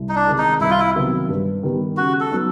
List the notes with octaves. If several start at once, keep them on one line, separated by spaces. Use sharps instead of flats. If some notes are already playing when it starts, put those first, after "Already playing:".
Already playing: C2
D#4
D4
C3 D#3 G#3
D#4
C2 E4
F4
E4
C3 D#3 F#3 B3
G2
D#3 G3 B3
C#3 F#4
A4
F#3 B3 D#4